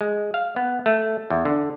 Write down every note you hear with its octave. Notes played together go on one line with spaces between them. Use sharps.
G#3
F5
B3
A3
E2
D3